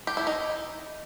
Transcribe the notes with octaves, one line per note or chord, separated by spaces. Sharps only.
G4
E4
D#4